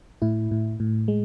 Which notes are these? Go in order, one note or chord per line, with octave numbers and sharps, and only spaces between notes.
A2 E4
A2
A2
G#3